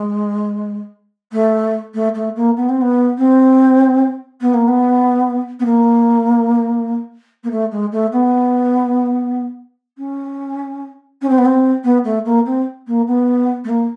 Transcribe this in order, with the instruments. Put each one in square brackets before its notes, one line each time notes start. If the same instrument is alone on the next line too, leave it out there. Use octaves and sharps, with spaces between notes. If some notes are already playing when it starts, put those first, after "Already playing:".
Already playing: [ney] G#3
A3
A3
A3
A#3
B3
C4
B3
C4
B3
A#3
B3
B3
A#3
A#3
A3
G#3
A3
B3
C#4
C#4
C4
B3
C4
B3
A3
A#3
C4
A#3
B3
A3
A#3